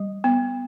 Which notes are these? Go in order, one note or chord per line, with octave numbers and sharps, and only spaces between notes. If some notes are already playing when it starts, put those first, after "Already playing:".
Already playing: G3
B3